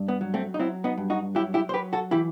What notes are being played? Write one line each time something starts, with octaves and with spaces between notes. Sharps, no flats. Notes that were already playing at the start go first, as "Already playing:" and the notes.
Already playing: G2
B3
F#3
A3 C4
D#4
F#3 C4 E4
B3 D#4
G2
D#4 F#4
F#3 E4 G4
E4 G4
C5
F#3 G4 B4
F#4 A4
E3 E4 G4